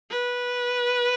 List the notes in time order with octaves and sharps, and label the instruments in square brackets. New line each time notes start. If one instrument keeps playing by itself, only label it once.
[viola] B4